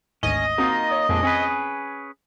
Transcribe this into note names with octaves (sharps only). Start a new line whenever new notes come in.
G#1 D2 G#2 C#4 D#5
A#3 C4 D#4 F4 F#4
C#5
F2 A#2 G#3 D4
C4 C#4 G#4 B4